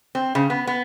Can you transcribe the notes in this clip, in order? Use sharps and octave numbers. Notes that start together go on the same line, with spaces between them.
C4
C#3
B3
B3